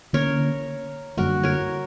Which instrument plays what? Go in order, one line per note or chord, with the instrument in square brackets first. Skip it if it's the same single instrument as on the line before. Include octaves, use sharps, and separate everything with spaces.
[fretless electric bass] D3 A#3 C#4 [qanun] A#4 C#5
[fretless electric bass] F#2 D3 G3 A#3 [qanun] F#4 A#4
[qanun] A#4 C#5